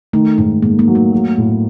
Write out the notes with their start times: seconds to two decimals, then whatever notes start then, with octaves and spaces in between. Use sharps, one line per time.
0.13 D#3 A3
0.38 G#2 A3
0.62 G#2 A#3
0.79 A#3
0.88 F#3
0.95 A3
1.12 F#3
1.38 A2